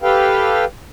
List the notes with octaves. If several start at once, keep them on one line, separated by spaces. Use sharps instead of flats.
G4 A4 B4 F5 G5